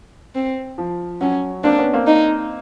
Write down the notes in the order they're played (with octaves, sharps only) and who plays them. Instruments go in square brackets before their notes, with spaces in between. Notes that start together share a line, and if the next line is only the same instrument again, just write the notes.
[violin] C4
[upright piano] F3
[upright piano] F#3 [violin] C#4
[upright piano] A#3 C4 [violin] D4
[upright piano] B3 C#4
A#3 C4
[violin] D#4